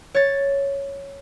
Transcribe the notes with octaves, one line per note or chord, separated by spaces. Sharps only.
C#5 A6